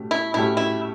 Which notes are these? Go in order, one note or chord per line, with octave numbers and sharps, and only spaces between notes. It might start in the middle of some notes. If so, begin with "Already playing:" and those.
Already playing: B2 A3 C#4 G4
E4
B2 A3 C#4 E4 G4
E4